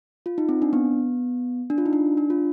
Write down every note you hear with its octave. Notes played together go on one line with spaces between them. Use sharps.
F4
D#4
C4
D4
B3
D4
F4
D#4
D4
D4
F4